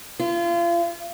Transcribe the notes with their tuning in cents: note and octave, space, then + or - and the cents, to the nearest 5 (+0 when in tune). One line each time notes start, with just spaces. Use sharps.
F4 -35